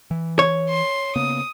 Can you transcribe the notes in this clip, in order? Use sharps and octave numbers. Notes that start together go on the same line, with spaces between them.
E3
C#5
C6
C#3 A#3 B3 D#6